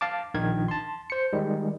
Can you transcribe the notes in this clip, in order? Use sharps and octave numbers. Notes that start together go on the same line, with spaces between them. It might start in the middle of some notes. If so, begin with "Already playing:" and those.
F5 A5 D6
A#1 D#3 A#4 G#6
A5 C6
C5 C#7
D#3 G3 G#3